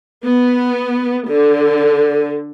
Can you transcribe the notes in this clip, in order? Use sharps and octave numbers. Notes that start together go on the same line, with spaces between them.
B3
D3